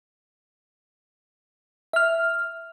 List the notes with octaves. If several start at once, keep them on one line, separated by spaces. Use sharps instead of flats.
E5 F6